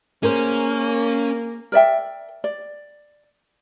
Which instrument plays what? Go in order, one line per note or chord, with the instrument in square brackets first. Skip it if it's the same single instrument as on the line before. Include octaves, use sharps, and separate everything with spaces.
[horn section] A#3 [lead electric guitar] C#4 [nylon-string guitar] G#4 A#4 C5
[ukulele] A#4 D5 E5 G5
D5